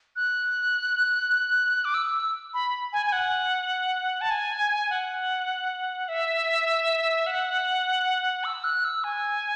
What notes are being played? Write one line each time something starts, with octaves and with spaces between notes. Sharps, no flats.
F#6
D6
E6
B5
G#5
G#5
F#5
A5
G#5
F#5
E5
F#5
E6
F#6
E6
G#5